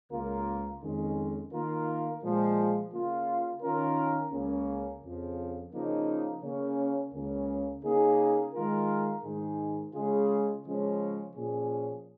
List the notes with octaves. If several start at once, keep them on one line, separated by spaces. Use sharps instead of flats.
C#2 C#3 A#3 F4 A#4
F2 D#3 G#3 C#4
D#3 A#3 F4 A#4
A#2 F3 G#3
C#3 A#3 F4
D#3 C#4 F4 A#4
C#2 C#3 A#3 C#4
F2 C#3 F3
C#3 F3 A#3 D#4
C#3 A#3 C#4
C#2 C#3 A#3 C#4
C#3 A#3 D#4 G#4
D#3 G#3 F4 A#4
G#2 D#3 G#3 D#4 G#4
C#3 G#3 F4 G#4
C#3 F3 G#3 C#4
A#2 F3 C#4 G#4